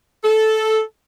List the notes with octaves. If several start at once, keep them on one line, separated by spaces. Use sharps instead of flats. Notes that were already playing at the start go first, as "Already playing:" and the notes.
A4